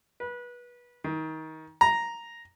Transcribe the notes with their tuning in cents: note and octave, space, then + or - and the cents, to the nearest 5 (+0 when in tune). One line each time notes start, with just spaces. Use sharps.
B4 -25
D#3 +25
A#5 +0